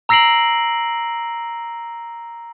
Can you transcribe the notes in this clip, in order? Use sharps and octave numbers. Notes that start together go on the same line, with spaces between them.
A#5 E6 A#6 C7 D7 F#7